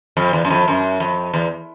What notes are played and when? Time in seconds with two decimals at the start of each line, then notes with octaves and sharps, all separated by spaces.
0.17 F2
0.33 E2
0.45 F#2
0.50 F2
0.68 F#2
1.00 F2
1.34 E2